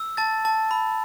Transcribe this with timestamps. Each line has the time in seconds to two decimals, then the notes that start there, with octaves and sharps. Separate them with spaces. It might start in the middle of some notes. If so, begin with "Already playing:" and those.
Already playing: E6
0.17 A5 A6
0.45 A5
0.71 B5